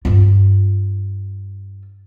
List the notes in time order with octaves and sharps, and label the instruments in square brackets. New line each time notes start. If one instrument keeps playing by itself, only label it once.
[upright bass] G2 F4